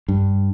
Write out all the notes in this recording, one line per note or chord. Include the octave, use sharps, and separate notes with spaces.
G2